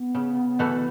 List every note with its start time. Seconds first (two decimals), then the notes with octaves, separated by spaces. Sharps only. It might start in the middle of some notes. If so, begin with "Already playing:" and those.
Already playing: B3
0.15 C#3
0.59 E3 A3 F#4